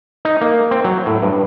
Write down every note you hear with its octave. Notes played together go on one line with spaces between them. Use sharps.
D#4
A#3
C4
F#3
A2
G2